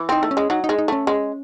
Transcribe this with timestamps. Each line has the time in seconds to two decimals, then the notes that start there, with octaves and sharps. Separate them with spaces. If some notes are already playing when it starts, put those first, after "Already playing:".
Already playing: E3
0.09 C4 D#4
0.23 A3
0.31 C#4
0.37 G#3
0.50 F#3 D#4
0.64 D#4
0.69 G#3
0.78 D#4
0.88 A3 C#4
1.07 G#3